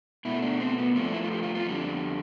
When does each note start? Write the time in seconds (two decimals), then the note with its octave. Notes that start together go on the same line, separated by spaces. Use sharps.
0.25 B2 A3 E4
0.42 D4
0.60 C4
0.78 B3
0.96 G2 F3 A3 C4
1.04 D4
1.14 E4
1.22 F4
1.31 G4
1.43 F4
1.55 F4
1.67 F2 D3 G3